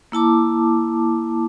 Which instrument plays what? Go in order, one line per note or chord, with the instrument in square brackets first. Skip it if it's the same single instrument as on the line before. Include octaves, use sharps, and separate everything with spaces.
[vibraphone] A#3 E4 A5 D6